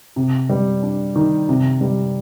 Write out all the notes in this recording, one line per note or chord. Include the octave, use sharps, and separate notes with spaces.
C3
G3
D4
D#3
C3
G3